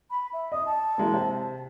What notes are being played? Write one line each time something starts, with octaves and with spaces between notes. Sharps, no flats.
B5
E5
D#5 D#6
A5
E3 G#3 A#3
C3